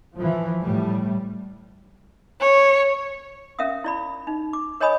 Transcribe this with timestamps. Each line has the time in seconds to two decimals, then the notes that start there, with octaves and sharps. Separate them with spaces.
0.15 E3 F3
0.60 A2 G3
2.40 C#5
3.59 C#4 A#4 E5 F5 D#6
3.84 E4 D5 B5
4.27 D#4
4.53 D6
4.80 A#4 C#5 D#5 G#5 B5 D#6